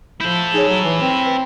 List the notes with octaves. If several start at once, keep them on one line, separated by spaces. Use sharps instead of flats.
F3 E4 A4 G6
D#4 G#4 C#5
F#3
E3
C4
B4